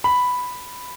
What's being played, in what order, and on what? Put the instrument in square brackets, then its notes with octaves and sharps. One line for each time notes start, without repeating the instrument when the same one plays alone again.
[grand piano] B5